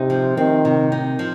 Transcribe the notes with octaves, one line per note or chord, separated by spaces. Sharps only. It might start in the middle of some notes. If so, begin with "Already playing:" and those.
Already playing: C3 D#4
F3
D#3 C4
C3
D#4
F3